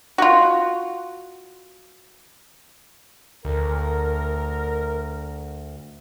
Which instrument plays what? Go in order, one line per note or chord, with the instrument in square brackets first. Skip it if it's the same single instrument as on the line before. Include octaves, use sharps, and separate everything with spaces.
[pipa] F4 F#4
[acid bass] D2 [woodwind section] A#4